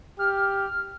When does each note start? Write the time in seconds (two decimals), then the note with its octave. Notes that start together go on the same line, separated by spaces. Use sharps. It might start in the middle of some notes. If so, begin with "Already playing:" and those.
0.19 G4 F6